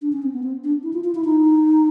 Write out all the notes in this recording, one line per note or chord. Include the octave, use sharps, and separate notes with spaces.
D4
C#4
C4
B3
C4
D4
E4
F4
F4
E4
D#4